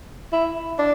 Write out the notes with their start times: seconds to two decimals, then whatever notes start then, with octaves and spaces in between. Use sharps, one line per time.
0.32 E4
0.79 D4